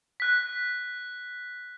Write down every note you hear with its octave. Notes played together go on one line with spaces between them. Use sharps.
F#6 B6